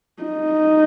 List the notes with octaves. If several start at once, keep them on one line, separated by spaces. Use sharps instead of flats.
D#4